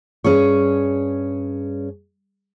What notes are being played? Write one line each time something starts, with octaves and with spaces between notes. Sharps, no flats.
G2 C#4 G#4 C#5